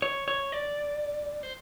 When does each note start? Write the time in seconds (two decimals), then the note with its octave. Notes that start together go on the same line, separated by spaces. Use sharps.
0.02 C#5
0.28 C#5
0.52 D5
1.43 C5